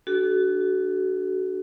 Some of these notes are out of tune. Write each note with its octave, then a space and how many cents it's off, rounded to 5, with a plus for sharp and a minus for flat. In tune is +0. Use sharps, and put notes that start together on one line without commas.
D4 +0 F#4 +20 A4 -35